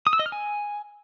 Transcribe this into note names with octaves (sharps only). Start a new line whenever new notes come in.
D#6
E6
D#5
F6
G#5